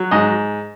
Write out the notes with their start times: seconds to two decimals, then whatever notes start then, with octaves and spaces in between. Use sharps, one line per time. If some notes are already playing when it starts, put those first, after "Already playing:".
Already playing: F#3
0.11 G#2 D#5